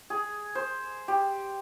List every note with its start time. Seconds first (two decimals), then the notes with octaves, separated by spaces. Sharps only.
0.10 G#4
0.55 C5
1.08 G4